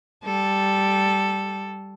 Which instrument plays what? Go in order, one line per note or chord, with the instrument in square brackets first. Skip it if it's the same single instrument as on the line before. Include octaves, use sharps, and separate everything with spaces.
[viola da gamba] G3 A4